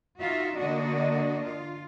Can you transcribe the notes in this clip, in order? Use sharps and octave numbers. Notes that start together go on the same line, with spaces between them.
D#4 F4 F#4 E5
D3 A#3 D4 F#4 D#5
F4